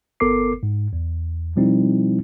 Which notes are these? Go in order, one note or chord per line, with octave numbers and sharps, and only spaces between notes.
G1 B3 A4 A#4 D6 C7
G#2
E2
B2 F3 G3 C4 D#4 E4